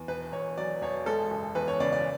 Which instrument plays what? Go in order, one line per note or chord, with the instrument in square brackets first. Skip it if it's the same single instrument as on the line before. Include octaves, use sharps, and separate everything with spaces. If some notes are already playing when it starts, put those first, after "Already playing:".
Already playing: [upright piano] E2
E1 B4
E1 C#5
F#3 D5
E1 C#5
G#3 A4
F#1
E2 B4
C#5
C#3 D5
D5